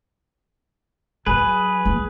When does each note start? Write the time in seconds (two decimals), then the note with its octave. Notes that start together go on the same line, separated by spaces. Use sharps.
1.26 F#3 G#4 B4
1.85 B3